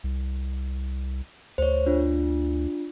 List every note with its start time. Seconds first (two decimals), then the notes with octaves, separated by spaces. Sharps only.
0.04 C2
1.58 D2 C5 C#5
1.87 D4 F4